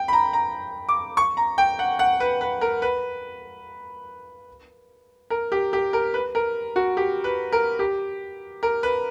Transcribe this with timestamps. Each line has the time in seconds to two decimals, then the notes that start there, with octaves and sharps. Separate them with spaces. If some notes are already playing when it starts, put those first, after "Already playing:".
Already playing: G5
0.08 B5
0.13 A#5
0.33 A#5
0.89 D6
1.17 C#6
1.37 A#5
1.58 G5
1.79 F#5
1.99 F#5
2.20 B4
2.41 B4
2.61 A#4
2.82 B4
5.30 A#4
5.52 G4
5.73 G4
5.93 A#4
6.14 B4
6.35 A#4
6.76 F#4
6.97 G4
7.24 B4
7.52 A#4
7.79 G4
8.63 A#4
8.83 B4